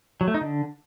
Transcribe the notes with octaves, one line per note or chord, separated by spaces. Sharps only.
F#3
A3
D#4
D3